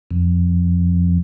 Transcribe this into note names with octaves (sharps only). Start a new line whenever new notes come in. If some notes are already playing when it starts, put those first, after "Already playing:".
F2